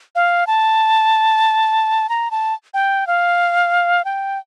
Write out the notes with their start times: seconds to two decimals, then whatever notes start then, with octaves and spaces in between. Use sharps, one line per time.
0.15 F5
0.47 A5
2.09 A#5
2.31 A5
2.74 G5
3.07 F5
4.05 G5